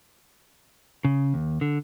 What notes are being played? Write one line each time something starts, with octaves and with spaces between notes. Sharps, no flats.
C#3
D#2
D3